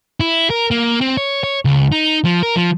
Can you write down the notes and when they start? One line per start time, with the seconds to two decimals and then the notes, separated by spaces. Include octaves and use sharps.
0.20 E4
0.50 A#4
0.71 A#3
1.01 C4
1.17 C#5
1.43 C#5
1.65 C#2
1.92 D#4
2.25 F3
2.43 A#4
2.56 F3